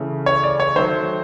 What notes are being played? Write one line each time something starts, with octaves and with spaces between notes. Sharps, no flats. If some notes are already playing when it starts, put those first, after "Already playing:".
Already playing: C#3 E3 A3
C#5
D5
C#5
D#3 F#3 A3 C5